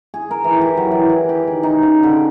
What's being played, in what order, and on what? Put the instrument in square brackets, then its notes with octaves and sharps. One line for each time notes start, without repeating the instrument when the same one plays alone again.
[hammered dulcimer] G#4
A#4
E3
G4
F#3
E3
G#4
G4
D#3
D#4
C#3
D3